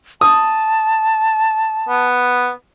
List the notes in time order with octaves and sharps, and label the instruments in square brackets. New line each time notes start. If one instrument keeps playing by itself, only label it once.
[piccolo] A5 [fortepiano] D#6
[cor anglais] B3